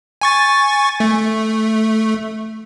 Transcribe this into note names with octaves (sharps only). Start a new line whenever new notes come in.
G#5 C#6 A6
A3